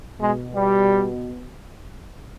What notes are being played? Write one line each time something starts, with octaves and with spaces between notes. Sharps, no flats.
B2 G#3
G3